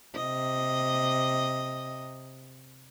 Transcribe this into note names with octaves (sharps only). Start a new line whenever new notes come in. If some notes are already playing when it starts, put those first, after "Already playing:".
C3 D#5